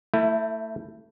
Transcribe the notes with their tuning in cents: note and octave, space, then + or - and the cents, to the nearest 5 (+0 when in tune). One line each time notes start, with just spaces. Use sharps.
A3 +25 E4 +0